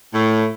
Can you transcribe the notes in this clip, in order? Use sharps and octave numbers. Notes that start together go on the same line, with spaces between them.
A2